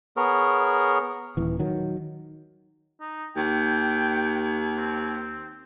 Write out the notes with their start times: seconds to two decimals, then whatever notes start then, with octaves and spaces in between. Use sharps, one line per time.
0.17 B3 G#4 A#4 C#5
1.37 D#1 E3
1.60 D#3 F#3
3.01 D#4
3.36 D#2 G5
4.78 C4